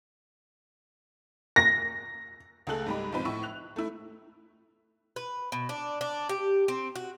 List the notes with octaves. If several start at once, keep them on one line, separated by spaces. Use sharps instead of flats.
A#6
C#2 A3 G#4 A4 F#6 F#7
G#2 G3 G#3 G4 B5
B1 G#2 F3 C4 B4
A2 E4 C#6
F#6 F7
A3 E4
B4
B2
D4
D4
G4
C4
F#4